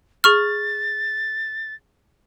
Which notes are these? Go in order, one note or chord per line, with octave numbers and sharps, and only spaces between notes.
G#4 C#6 F6 A6